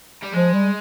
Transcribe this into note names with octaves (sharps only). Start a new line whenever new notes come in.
G3
F3 G#3
G3